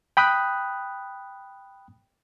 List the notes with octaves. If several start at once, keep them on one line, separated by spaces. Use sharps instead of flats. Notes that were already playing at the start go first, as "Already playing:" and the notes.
G5 B5 D#6 F#6